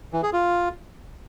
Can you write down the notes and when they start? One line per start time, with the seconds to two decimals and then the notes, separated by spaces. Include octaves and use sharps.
0.13 E3
0.23 G#4
0.33 F4